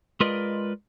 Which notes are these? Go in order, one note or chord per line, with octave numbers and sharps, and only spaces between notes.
G#3 F4 A#4 B4 D5 D#5